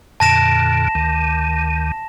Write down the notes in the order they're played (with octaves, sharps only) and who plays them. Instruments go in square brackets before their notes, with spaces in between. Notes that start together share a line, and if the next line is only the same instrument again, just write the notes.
[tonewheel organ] F2 A#2 D3 [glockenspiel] A5 A#6 E7
[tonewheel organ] D2 D#3